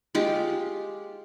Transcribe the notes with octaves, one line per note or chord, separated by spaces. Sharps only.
G#3 F4 G4